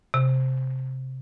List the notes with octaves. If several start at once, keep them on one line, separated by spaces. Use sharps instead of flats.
C3